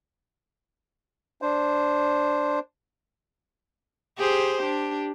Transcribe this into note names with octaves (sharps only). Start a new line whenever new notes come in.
D4 C5
G4 G#4 C5
D4 G4